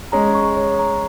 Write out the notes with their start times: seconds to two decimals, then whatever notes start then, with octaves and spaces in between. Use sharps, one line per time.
0.12 G#3 C#4 A#5
0.35 C#6
0.56 C#5
0.79 A#5